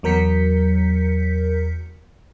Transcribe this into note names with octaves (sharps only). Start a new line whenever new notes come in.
E2 F#3 A#4 G6 B6 C#7